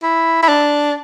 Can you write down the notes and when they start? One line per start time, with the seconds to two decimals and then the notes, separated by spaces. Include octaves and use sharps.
0.03 E4
0.43 E4
0.49 D4